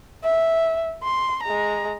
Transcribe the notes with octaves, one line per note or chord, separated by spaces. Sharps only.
E5
C6
G#3 A#5